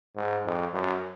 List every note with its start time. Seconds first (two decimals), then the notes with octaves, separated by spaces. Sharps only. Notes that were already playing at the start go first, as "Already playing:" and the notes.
0.16 G#2
0.45 F2
0.73 F#2